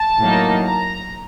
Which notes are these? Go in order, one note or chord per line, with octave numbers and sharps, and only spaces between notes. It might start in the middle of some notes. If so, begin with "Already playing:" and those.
Already playing: A5
A2 F#3 A#3 D#4
A#5